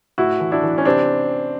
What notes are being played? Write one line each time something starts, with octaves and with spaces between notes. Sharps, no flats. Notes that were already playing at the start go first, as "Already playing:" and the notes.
A2 E4 F#4
E3
D4 E4
E3
C#4
C3 C4 D4